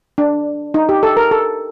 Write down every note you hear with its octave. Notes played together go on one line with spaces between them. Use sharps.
D4
D#4
G4
A4
A#4
A4